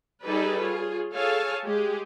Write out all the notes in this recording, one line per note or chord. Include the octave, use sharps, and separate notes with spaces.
G3 D#4 G#4 A4 B4 D5
F4 G#4 C#5
G#4 A4 C#5 F5 G#5 A5
G#3 G4 G#4